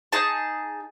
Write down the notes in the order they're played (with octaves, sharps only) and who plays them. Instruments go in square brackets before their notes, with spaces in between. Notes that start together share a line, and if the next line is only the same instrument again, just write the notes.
[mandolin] D#4 G#4 A5